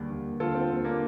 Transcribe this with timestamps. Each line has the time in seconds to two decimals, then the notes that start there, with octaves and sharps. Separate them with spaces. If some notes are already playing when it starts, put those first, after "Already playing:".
Already playing: D#2 D3 G3
0.10 D#2
0.40 D3 F4 A4
0.55 C4
0.70 D#2 C4
0.85 A#3 D4